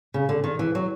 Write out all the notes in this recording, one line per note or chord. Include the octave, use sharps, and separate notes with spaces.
C#3
D3
D#3
E3
F#3